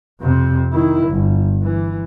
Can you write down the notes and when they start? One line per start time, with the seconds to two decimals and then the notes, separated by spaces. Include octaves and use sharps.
0.20 F2 C3
0.72 D#3 E4
1.07 G1
1.63 E3